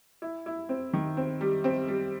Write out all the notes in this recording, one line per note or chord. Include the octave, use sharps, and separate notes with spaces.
E4
E4
C4
D#3
C4
G3
C4
G3